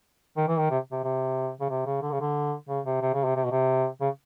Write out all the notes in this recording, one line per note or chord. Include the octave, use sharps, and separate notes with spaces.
D#3
E3
D#3
C3
C3
C3
C#3
C3
C#3
D3
C#3
D3
C#3
C3
C3
C#3
C3
C3
B2
C3
C#3